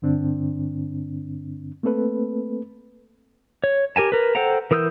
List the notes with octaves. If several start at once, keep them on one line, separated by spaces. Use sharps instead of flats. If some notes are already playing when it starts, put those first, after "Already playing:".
G2 D3 C4 D4
A3 A#3 C4 A4 B4
C#5
G4 A#4 G#5 A5
A#4 B4
A4 C5 F#5 G5 A#5
E3 A#4 D#6 E6 G6